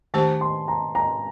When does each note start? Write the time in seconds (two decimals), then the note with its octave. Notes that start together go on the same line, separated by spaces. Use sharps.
0.14 D#3 A3 D4 G4 C5 A5
0.41 C6
0.68 A#5
0.95 A#5